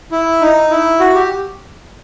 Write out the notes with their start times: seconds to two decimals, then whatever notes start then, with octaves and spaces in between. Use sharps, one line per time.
0.12 E4
0.41 D#4
0.71 E4
1.00 F#4
1.14 G4